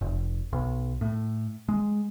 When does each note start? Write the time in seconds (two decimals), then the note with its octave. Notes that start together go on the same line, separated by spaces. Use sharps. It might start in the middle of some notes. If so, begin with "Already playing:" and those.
0.01 F1
0.53 B1
1.01 A2
1.69 G#3